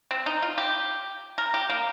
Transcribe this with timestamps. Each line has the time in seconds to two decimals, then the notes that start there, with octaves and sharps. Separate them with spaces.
0.11 C4
0.26 D#4
0.42 F4
0.58 G4
1.38 A#4
1.54 G4
1.69 A#3